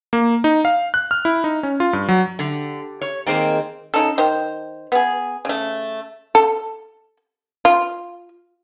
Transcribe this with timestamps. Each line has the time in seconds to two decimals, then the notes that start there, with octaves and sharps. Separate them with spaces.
0.13 A#3
0.44 D#4
0.65 F5
0.94 F#6
1.11 F6
1.25 E4
1.44 D#4
1.63 C#4
1.80 F4
1.93 G2
2.08 F#3
2.39 D3 G4
3.01 C#5
3.27 D#3 G#3 A#3 C4 D#4 C5
3.94 C#3 D#4 A4
4.18 D#3 C5
4.92 B3 G#4
5.45 C#3 A3
6.35 A4
7.65 F4